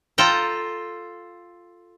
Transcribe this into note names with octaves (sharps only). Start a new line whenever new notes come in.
F4 A4 G5 A#5